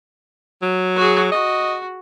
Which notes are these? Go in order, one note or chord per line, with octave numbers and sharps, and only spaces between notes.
F#3
F#4 G#4
F#4 D#5